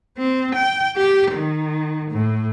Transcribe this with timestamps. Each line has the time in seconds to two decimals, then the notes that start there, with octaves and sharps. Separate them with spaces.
0.18 C4
0.55 G5
0.97 G4
1.32 D#3
2.11 A2